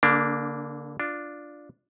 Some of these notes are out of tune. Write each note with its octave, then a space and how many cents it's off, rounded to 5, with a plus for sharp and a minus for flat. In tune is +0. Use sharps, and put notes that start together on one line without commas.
D3 -40 A#3 +0 D4 +0
D4 +0 F4 +0